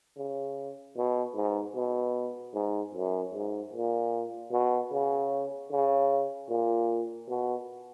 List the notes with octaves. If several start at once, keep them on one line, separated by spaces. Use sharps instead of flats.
C#3
B2
G#2
B2
G#2
F#2
G#2
A#2
B2
C#3
C#3
A#2
B2